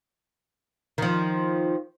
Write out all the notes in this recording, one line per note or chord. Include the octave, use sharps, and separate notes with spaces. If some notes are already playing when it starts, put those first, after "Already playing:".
D#3 F3